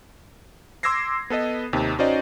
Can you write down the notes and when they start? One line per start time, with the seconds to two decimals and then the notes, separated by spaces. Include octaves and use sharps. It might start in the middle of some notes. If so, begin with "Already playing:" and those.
0.83 C6 D6 E6 G#6 A#6 C7
1.30 B3 A4 B4 D#5
1.73 D#2 C3 D#4
1.99 C#4 D#4 F#4 C5 D5 D#5